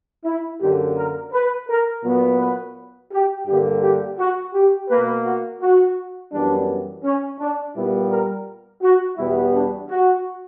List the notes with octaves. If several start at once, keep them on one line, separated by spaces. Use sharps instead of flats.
E4
F#2 D3 A#3 G4
A#4
B4
A#4
A#2 F#3 B3
B4
G4
G2 D3 A#3 G4
G4
F#4
G4
B2 A#3 B4
F#4
F#4
F#2 E3 G3 B3 D4
C#4
D4
A#2 G3 B3 E4
A#4
F#4
E2 B2 G3 B3 E4
D4
F#4